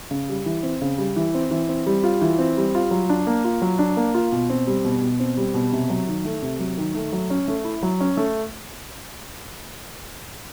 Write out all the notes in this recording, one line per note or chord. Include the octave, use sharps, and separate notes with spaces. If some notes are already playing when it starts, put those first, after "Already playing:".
C#3
G3
E3
C4
C#3
G3
E3
C4
E3
C4
G3
F4
E3
C4
G3
F4
F#3
D4
A#3
F4
F#3
D4
A#3
F4
B2
C4
G3
B2
B2
C4
G3
B2
C3
F#3
D#3
A3
C3
F#3
D#3
A3
F#3
C#4
A3
E4
F#3
C#4
A3